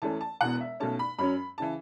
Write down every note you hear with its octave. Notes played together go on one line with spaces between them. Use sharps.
E2 E3 A3 C#4 A5
A5
E1 E2 B2 B3 F#5
E5
B1 B2 A3 C#4 A5
B5
F#2 F#3 C#4 B5
C#3 E3 A5